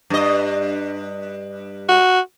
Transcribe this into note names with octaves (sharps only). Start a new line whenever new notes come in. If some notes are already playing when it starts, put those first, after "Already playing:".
G2 D#5
F#4